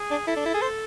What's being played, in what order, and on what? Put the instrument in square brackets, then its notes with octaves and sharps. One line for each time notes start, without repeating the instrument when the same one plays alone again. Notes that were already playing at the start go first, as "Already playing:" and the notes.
Already playing: [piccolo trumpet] G#4
[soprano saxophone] D4
[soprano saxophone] E4 [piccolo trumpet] A4
[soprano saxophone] D4
E4
G#4
C5